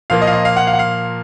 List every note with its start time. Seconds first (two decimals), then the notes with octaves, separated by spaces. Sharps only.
0.10 A#2 F3 A#3 F5
0.22 D#5
0.27 F5
0.33 D#5
0.45 F5
0.57 F#5
0.67 F5
0.73 F#5
0.79 F5